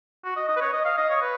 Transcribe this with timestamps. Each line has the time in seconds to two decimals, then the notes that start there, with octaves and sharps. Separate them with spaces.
0.25 F#4
0.36 D#5
0.48 D#5
0.56 B4
0.61 C#5
0.73 D#5
0.85 F5
0.98 D#5
1.10 C#5
1.22 B4